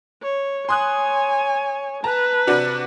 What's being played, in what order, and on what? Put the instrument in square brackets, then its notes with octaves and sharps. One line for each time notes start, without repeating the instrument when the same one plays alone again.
[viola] C#5
[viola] C#5 G#5 [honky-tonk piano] C6 D#6 F#6
[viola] B4 [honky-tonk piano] A5 A#5
[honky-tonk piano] C3 D4 F#4